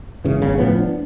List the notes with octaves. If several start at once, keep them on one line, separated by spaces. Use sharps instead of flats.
G#1 C#3 E3
G1 C#3
A2 F3 B3
D4